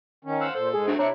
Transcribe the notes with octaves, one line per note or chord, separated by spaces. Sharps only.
D#3 C#4
C5 F5 F#5 E6
A#2 A4 C5
G#2 G#3 G#4
F#3 A3 C4 D4
C3 C4 D4 E4 C#5 A#5 C#7